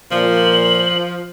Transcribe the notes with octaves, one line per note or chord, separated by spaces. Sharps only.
A#2 F3 F#7